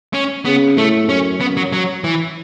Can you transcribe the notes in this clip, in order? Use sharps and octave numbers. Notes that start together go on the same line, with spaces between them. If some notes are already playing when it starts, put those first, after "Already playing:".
C#4
C#3 B3
A2 A3
F#2 C#4
F#2 B3
F#3
F#3
E3